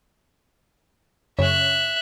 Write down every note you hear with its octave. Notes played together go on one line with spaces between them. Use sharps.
F#2 C#3 C#5 E5 F#6